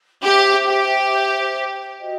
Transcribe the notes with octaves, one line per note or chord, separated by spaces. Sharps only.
G4 C5 E5 G5
G4
F#4 A4 D#5 G5